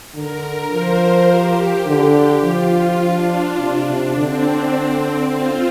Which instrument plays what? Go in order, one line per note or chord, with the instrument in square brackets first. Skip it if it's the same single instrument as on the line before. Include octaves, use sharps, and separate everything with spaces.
[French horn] D3 [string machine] A#4
[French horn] F3 [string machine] C5
[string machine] A#4
G4
[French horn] D3
[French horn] F3 [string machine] F4
[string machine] D4
[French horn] C3
C3
[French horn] D3 [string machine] C4
[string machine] F4